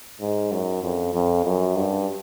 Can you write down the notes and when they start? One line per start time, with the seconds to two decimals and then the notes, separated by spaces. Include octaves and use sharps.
0.21 G#2
0.52 F#2
0.83 F2
1.14 F2
1.44 F#2
1.76 G2